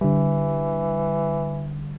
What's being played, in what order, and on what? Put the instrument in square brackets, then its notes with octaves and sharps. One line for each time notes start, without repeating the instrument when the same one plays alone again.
[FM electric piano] D3 G3 [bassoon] E3